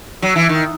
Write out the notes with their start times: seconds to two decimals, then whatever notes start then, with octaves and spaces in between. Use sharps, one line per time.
0.22 F#3
0.36 E3
0.49 D#3